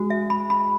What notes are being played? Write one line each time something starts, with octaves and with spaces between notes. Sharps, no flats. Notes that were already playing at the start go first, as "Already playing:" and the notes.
Already playing: G#3 F#4
E5
B5
B5